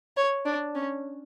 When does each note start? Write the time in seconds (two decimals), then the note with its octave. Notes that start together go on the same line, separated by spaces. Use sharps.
0.17 C#5
0.45 D4
0.75 C#4